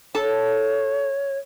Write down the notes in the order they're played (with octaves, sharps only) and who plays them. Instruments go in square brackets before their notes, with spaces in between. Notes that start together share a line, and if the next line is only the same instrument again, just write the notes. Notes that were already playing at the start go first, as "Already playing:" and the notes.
[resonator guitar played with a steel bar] A4 A5 [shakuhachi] C#5